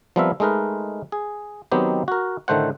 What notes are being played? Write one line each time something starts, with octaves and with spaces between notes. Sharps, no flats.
F3 G3 B3 C4 A#4 E5
G#3 A3 D#4 A#4 B4
G#4
D#3 F#3 B3 C4 D#4 G4
F#4 A#4
A2 D3 D#3 A3 C5 F#5